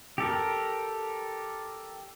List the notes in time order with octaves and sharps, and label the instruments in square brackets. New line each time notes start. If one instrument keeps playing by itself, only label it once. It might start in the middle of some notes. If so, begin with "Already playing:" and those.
[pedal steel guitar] G4 A4 A#4